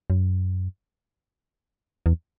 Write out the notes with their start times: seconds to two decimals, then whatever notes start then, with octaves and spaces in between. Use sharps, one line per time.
0.10 F#2
2.06 E2